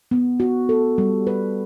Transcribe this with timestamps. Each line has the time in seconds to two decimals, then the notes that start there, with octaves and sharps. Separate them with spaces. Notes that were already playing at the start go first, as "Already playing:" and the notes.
0.11 B3
0.40 F#4
0.69 A4
0.98 G3
1.27 B4